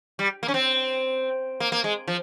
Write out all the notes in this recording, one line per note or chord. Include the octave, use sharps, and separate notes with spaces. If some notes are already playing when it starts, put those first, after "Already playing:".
G3
A#3
C#4
C4
A#3
A#3
G#3
F3